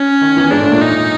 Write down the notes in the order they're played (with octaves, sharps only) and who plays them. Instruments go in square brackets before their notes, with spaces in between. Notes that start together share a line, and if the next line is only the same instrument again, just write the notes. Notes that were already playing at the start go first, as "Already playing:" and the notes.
Already playing: [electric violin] C#4
[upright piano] D#3
E2 E3
[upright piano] G#2 G#3 [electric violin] D4
[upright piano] A2 A3
A#2 A#3
[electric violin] D#4